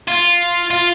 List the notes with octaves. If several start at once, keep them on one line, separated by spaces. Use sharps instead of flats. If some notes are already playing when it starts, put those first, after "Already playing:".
F4
F4